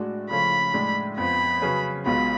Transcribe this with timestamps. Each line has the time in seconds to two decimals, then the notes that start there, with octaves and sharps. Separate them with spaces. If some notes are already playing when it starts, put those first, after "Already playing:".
Already playing: A2 G#3 D4 F#4
0.30 C#3 F3 A3 C#4 B5
0.74 A2 G#3 D4
1.18 F2 F3 B3 B5
1.62 C#3 F#3 C#4 G#4 B4
2.06 B1 B2 G#3 B3 F4 B5